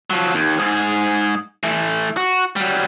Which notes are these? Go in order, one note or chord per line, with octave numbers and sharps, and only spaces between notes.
F3 F#3
D#2
G#2 G#4
E3 A3
F#4
F#3 G3